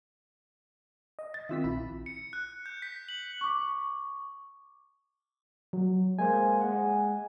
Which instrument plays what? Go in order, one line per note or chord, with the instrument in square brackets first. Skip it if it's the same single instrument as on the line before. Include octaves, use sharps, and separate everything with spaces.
[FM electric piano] D#5
[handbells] A6
[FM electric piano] D#3 E6 B6 [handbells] C4 F4 E5
[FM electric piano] A#1 E4 B5
[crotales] C#7
F#6
G6
B6
F#7
[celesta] C#6 D6
[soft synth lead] F#3
[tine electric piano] G#3 A#3 C5 [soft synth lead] G#5
[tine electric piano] G#3 F#5